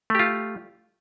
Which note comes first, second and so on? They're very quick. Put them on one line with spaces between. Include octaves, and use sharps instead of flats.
A3 G4 F4